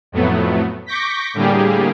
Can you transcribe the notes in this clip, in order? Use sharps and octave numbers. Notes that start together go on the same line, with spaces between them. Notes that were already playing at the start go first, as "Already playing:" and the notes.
F2 A2 F#3 A3 B3
C#6 D6 G6 A#6 B6
A2 D3 G3 A#3 G4 G#4